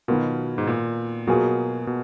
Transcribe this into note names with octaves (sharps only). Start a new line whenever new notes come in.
B2 D#3 F#3 B3 F4 A#4
G#2
A#2
B2 F#3 A#3 F4 G#4
B2